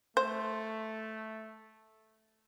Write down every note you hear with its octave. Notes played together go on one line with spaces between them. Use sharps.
A3 C5